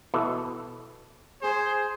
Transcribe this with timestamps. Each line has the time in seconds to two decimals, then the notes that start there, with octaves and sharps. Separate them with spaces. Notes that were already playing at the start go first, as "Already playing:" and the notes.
0.14 B2 E3 A4
1.42 G#4 C5